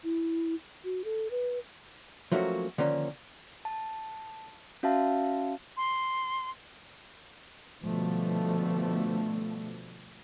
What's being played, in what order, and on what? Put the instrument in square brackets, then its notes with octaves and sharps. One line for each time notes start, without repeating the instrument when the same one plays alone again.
[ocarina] E4
F#4
A4
B4
[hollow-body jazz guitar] F3 F#3 A3 A#3 C#4 F#4
D3 D#3 F3 A#3 C#4
[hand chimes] A5
C#4 F#4 E5 F5 A5
[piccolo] C6
[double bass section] B2 D3 F3 G3 A3